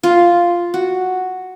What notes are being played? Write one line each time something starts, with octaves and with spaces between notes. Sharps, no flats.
F4
F#4